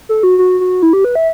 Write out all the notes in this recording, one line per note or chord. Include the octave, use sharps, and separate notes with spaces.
A4
F#4
F#4
F#4
E4
G4
B4
E5